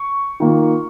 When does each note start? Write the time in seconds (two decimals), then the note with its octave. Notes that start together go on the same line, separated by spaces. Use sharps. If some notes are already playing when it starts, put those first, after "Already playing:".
Already playing: C#6
0.40 D#3 A#3 F4